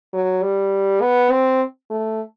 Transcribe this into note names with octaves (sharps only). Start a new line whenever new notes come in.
F#3
G3
B3
C4
A3